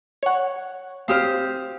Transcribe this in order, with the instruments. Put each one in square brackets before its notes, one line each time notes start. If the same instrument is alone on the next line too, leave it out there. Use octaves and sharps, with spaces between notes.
[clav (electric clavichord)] C#5 F#5
[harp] C4 G4 C5 [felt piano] F5 D#6 F6